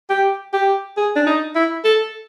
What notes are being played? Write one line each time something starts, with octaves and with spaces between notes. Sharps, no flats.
G4
G4
G#4
D4
D#4
E4
A4